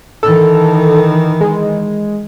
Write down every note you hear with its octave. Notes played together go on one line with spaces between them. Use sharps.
D#3 E3 A4
G#3